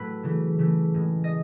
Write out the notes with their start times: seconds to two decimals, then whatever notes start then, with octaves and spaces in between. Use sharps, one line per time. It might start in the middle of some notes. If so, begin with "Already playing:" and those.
Already playing: A2 F#3 A3 B4
0.23 C#3 E3 A3
0.59 C#3 E3 A3
0.94 A2 G#3
1.24 D#5